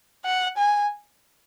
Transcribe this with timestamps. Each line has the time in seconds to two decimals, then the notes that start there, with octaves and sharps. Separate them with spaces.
0.25 F#5
0.57 G#5